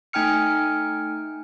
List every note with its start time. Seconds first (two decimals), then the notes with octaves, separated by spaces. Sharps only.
0.13 A3 D#4 G5 G#5 F6 C#7